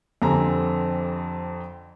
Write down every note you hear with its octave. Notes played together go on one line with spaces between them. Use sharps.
F2 D3 C4 G4 G#5 A#5